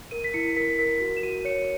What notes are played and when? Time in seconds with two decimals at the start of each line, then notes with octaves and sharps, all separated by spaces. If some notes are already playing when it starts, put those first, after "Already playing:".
0.11 A#4 D#7
0.24 B6
0.34 E4 C#7
0.56 A#4 B6
0.79 A#4 B6
1.00 F#4
1.17 E7
1.23 F#4 D#7
1.38 D#7
1.45 C#5 C#7